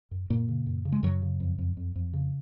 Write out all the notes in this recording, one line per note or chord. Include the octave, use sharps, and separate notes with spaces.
F#2
F#2 A#2 A#3
C#3
F#2
C#3
G#3
F#2 C#3 F#3
C#3
F2
F2
F2
F2
C#3